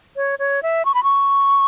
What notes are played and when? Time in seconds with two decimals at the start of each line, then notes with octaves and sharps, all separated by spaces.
0.16 C#5
0.39 C#5
0.63 E5
0.85 C#6
0.94 B5
1.03 C#6